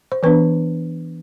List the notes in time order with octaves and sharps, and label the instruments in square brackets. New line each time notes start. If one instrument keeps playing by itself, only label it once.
[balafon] C5
E3 B3 D4 B4